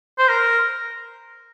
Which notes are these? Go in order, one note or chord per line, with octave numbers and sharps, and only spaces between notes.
C5
A#4